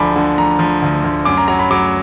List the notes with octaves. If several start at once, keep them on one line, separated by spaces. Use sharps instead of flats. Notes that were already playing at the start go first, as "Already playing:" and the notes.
Already playing: D2 D3 F3 G#5 A#5 B5 D6
D3
F3 A#5
F3
D2
D2
F#2 D6
A#5
F#3 A#5
B5
F#3 D6